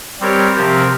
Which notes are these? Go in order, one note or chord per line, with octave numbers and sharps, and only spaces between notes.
G3 C4 G4 A#4 C#5
C3 F3 C4 G4 A#4